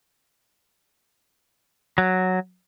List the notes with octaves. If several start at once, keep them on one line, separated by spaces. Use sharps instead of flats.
F#3